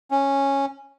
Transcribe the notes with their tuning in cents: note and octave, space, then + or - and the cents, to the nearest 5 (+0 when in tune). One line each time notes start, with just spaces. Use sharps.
C#4 -10